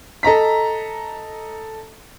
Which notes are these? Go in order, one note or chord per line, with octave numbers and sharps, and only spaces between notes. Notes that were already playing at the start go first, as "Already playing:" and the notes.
A4 D#5 A#5 B6